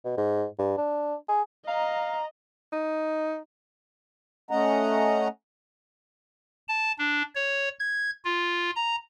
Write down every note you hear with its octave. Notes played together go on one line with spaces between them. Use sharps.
B2
G#2
G2
D4
G#4
D#5 F5 A#5
D#4
A3 C#4 D#5 F#5 A#5
A5
D4
C#5
G#6
F4
A#5